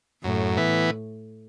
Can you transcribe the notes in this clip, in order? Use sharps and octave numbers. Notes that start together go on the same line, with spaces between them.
F#2 A2
E3 B3